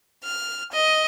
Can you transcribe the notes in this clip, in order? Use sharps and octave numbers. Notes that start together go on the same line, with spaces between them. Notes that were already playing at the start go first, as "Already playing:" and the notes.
F6
D#5